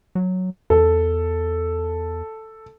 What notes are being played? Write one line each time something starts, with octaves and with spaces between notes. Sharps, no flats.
F#3
E2 A4